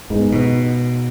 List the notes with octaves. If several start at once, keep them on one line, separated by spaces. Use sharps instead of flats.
G#2 B3 D#4 G#4
B2